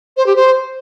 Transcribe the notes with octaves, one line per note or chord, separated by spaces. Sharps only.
C5
G4
C5